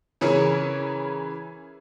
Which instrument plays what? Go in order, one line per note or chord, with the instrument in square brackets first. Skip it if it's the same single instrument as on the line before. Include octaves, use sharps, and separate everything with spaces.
[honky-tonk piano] C#3 E3 C#4 G#4 A#4